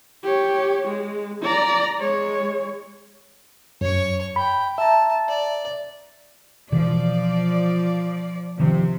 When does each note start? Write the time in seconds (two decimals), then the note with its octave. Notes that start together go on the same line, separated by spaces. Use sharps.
0.23 G4 C#5
0.88 G#3
1.42 D5 A#5
2.00 G#3 C#5
3.81 F#2 C#5 C#6
4.36 G5 B5
4.78 E5 A5 A#5
5.28 D5
6.72 B2 E3 F3 D5
8.60 C3 D#3 F3 C4